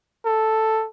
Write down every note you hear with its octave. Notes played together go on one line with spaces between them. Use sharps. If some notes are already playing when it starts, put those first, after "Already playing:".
A4